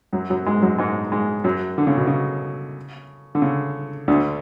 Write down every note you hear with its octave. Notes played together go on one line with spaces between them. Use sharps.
F#2 F#3
F#2 F#3
G#2 G#3
F#2 F#3
G#2 G#3
G#2 G#3
F#2 F#3
D3
C#3
B2
C#3
D3
C#3
D2 D3